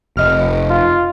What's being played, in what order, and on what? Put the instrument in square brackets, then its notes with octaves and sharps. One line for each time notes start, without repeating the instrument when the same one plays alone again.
[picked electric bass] F1 [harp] D#5 F6
[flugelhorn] F4